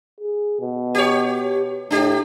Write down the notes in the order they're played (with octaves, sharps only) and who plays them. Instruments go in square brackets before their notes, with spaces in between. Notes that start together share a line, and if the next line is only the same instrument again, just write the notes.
[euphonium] G#4
B2
[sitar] G4 C#5
[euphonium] A2 [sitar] D4 G4